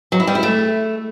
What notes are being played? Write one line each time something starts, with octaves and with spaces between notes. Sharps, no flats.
F#3
E4
G3
E4
A3